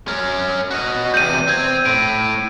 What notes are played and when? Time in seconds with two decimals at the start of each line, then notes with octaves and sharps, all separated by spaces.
0.08 C#4 A#4
0.71 F#4 D#5
1.14 E2 C3 G6 D#7
1.48 C4 G6 G#6
1.85 A2 D7